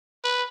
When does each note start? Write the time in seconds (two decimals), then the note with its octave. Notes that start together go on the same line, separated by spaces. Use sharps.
0.24 B4